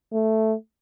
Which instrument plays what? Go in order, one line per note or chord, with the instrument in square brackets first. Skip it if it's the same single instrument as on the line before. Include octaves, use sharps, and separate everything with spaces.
[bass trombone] A3